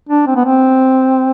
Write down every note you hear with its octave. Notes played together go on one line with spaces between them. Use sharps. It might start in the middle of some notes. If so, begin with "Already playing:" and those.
D4
C4
B3
C4